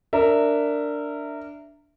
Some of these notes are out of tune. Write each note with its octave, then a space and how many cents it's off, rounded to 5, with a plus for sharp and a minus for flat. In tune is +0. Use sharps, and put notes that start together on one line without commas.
D4 +0 A#4 -20 E5 +0